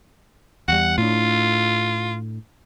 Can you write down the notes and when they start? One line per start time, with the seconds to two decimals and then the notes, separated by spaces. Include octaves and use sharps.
0.68 E2 G3 F#5
0.98 A2 D4 F4